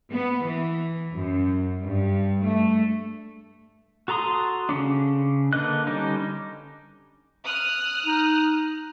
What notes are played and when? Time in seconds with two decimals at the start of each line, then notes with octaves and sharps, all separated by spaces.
0.12 B3
0.46 E3
1.12 F#2
1.83 G2
2.43 A3
4.08 F#4 A4 A#5 C6 D#6
4.69 C#3 G3 C#4 D4
5.53 D3 A#3 B4 D#5 F#6
5.87 D3 G3 C#4 D#4
7.45 D#6 F6 F#6
8.06 D#4